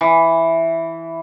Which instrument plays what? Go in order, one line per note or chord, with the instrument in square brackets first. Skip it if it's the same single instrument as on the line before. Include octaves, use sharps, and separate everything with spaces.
[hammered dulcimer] E3